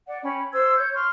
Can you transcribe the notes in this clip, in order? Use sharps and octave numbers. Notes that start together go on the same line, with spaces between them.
D5 F#5
C#4 G5 B5
C5 C6 E6 G#6
C#5 G6
C6 C#6 F6